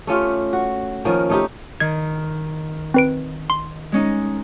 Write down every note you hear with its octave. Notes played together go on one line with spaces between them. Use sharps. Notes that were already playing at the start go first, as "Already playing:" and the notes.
A3 C#4 F4 G4
F#4
D#3 F3 A#3 C#4
A3 D#4 G4
D#3 G#6
C4 B4 D7
C6
G#3 C#4 D#4